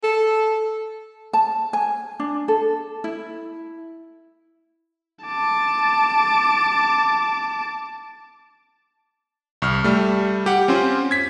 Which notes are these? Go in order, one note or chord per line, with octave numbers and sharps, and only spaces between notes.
A4
A5
G#5
D4
A4
E4
A5 D6
C2 C#6 F6
G3 A3
G4 F#5
C4 C#4 F4 C5
G#6 B6